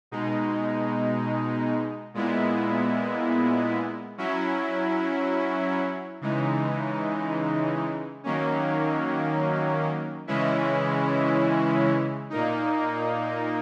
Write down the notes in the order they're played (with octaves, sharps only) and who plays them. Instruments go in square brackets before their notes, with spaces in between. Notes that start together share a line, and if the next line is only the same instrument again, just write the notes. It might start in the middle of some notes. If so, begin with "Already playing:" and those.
[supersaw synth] B2 G#3 D#4
A#2 G#3 B3 E4
F#3 C#4 E4
C#3 E3 G#3 D#4
D#3 F#3 A#3 C#4
C#3 E3 G#3 C#4 E4
A#2 A#3 D#4